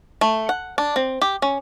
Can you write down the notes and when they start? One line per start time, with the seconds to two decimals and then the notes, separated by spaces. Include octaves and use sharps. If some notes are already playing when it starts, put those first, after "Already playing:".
0.21 A3
0.49 F#5
0.78 D4
0.96 C4
1.22 G4
1.42 C#4